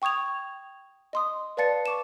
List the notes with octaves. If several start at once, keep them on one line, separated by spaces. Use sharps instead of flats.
G5 C#6 D#6 G#6 F7
D#5 C6 D#6
B4 D5 F5 A5 A6 C#7
C#6 D6 E7